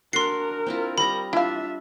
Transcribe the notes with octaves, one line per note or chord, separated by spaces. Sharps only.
D4 F#4 A#4 C6 C7
C4 E4 F4
G3 D#5 A#5 B5
D4 E4 F4 E5 F5